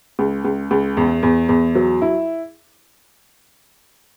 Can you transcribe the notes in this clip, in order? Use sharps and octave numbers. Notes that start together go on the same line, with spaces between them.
C#2
C#2
C#2
E2
E2
E2
F#3
E4